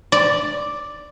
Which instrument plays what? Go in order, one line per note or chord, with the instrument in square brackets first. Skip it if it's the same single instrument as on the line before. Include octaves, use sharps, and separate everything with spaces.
[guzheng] D5